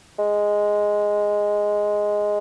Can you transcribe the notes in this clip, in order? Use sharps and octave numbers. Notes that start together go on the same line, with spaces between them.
G#3